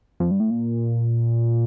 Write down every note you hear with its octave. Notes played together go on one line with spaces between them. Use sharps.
F2
G2
A2
A#2